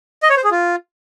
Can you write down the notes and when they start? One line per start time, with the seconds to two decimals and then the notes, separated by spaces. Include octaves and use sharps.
0.23 D#5
0.30 C#5
0.37 C5
0.44 G#4
0.51 F4